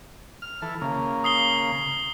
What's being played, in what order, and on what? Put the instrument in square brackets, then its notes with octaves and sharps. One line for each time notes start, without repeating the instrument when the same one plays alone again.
[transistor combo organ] F6
E3 A4
C#3 A#3
[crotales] D#6 C7 G7